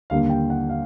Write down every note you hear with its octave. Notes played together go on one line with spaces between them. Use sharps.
D#2 D3 G3 A#3 F5
G5
F#5
F5